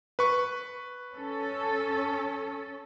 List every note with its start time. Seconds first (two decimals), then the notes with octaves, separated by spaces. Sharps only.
0.19 B4 C#6
1.13 C#4 A4